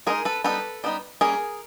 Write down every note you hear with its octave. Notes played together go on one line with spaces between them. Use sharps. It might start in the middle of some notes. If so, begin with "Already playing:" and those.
G#3 C4 D#4 G#4 A#4
A4 B4
G3 B3 D#4 A4 B4
G3 B3 D#4
G3 A#3 C#4 G#4 A#4